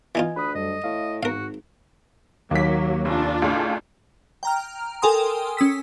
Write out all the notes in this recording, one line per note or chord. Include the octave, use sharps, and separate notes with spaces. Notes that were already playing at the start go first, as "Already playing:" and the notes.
E3 D#4 F4 D#5 G#5 G#6
D2 B4 B5 D#6
F#2 G3 A4 D#5
A2 F5
G#1 G#2 F#4 A#4 F5
D#2 F#3 A#3 B6
F1 D4 F4
C#2 A2 G#3
G5 A#5 F6
A4 A#4 G5 G#5 C6 D#6
C#4 D#6 E6 B6